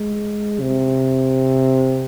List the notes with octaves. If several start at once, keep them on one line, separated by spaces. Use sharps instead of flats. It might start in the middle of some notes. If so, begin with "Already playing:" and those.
Already playing: G#3
C3